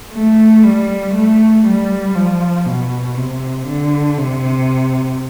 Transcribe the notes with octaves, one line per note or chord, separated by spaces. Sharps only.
A3
G3
A3
G3
F3
B2
C3
D3
C3